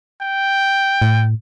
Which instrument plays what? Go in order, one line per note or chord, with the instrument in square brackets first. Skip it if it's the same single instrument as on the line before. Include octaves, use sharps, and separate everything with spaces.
[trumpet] G5
[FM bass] A2